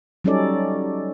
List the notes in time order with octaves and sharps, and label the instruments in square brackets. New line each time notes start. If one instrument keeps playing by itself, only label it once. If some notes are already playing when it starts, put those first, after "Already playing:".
[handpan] F#3 G3 C#4 D#4 A4 D5